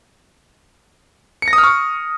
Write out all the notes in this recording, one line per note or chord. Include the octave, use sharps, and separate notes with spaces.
C#7
A#6
D#6
F6
C#6